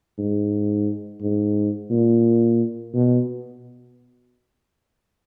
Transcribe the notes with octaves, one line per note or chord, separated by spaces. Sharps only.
G#2
G#2
A#2
B2